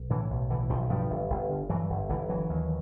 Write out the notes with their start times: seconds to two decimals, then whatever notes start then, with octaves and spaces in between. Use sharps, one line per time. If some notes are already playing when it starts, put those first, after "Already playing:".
Already playing: B1
0.10 A2 D3 E3
0.30 B1
0.50 A2 D3 E3
0.70 B1 D#3 F3
0.90 G2 F3 G3
1.10 G1
1.30 G1
1.49 D3
1.69 G2 E3 F#3
1.90 G1
2.09 G1 D3 E3
2.29 D3 E3 F#3
2.49 D#2